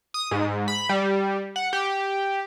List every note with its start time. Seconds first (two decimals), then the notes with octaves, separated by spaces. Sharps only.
0.14 D#6
0.31 G#2
0.68 B5
0.89 G3
1.56 F#5
1.73 G4